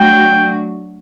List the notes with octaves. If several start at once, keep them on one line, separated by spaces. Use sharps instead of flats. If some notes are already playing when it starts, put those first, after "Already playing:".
Already playing: F#3 A3 D4 F#4 G5